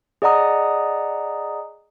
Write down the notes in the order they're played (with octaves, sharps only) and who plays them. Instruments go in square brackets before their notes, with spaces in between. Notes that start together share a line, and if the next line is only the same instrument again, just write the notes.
[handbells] G#4 D5 D#5 F#5 A#5 D#6